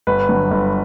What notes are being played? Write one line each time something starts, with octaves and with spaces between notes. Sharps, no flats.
G1 B4
G2 D3 F#3
G1